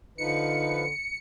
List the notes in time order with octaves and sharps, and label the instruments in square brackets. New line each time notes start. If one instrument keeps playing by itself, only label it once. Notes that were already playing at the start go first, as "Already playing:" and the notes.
[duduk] D3 [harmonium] F3 B4 [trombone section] D#4 [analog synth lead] C#7